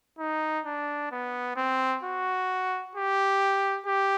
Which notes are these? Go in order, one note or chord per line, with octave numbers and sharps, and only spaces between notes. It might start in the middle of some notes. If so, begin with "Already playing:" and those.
D#4
D4
B3
C4
F#4
G4
G4